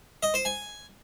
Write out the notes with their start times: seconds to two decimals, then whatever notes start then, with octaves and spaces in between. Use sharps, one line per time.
0.23 D#5
0.34 C5
0.45 G#5